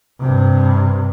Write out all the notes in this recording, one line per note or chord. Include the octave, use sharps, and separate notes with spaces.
G2 C3